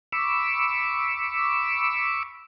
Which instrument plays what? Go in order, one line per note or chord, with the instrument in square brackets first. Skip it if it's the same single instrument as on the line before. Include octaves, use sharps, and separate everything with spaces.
[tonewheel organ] B5 C#6 D6 E6